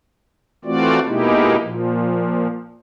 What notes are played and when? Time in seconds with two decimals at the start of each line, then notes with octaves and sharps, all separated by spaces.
0.65 E3 A3 C4 F4 F#4 D5
1.06 B2 G#3 A#3 D#4 E4 G4
1.60 A#2 F3